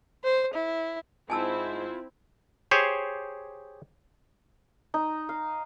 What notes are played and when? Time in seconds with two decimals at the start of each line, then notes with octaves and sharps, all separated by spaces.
0.24 C5
0.54 E4
1.30 G#2 C4 E4 F4 G#5 A5 E6
2.71 G4 G#4 C5 C#5
4.94 D#4
5.29 F5